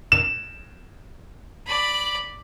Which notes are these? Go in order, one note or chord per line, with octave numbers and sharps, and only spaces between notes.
E7
D5 B5